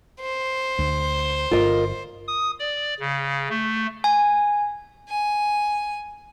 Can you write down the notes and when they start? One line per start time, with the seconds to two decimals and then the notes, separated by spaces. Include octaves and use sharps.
0.21 C5
0.79 D2
1.51 G1 F4 A#4 D#5
2.28 D#6
2.59 D5
3.00 C#3
3.50 A3
4.04 G#5
5.08 G#5